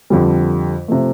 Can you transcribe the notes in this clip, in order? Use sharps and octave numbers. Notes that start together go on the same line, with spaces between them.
F2 D3 G3
C3 F3 A3